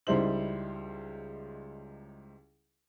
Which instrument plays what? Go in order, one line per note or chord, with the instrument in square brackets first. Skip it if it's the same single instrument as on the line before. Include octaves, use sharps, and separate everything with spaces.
[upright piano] C#2 G3 D#4 E4 C5 F#7